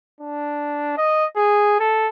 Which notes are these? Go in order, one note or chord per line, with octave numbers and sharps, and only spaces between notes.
D4
D#5
G#4
A4